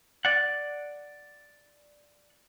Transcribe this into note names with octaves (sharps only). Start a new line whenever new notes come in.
D5 F#5